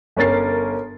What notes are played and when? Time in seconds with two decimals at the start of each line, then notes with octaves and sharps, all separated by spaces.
0.16 G1 C#4 A#4 A6 C7